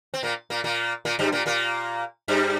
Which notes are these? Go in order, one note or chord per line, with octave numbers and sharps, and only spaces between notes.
C4
A#2 A#3
A#2 A#3
A#2 A#3
A#2 A#3
G2 G3
A#2 A#3
A#2 A#3
G2 G3